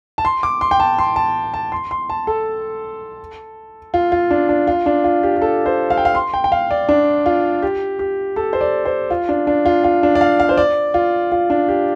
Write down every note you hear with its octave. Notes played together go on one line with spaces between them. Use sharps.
A5
C6
D6
C6
G5
A5
C6
A5
A5
C6
C6
A5
A4
F4
F4
D4
D4
F4
D4
F4
G4
G4
A4
C5
F5
G5
F5
C6
G5
G5
F5
D5
D4
F4
G4
G4
A4
C5
D5
C5
F4
D4
D4
F4
F4
D4
D5
F5
F5
C5
D5
F4
F4
D4
G4